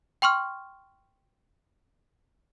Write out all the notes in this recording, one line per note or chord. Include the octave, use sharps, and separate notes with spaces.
G5 C6 C#6 F6